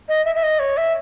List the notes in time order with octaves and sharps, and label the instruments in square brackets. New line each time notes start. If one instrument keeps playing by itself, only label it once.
[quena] D#5
E5
E5
D#5
C#5
E5